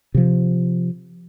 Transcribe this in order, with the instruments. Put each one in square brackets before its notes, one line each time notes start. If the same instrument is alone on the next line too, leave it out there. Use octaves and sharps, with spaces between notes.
[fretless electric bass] C3 F3